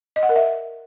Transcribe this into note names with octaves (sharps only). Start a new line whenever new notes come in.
D#5
F#5
A#4
E5